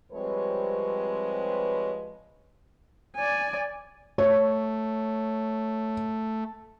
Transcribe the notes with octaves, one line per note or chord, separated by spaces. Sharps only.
F3 G3 G#3 C4 B4 C#5
D5 G#5
A3 C#5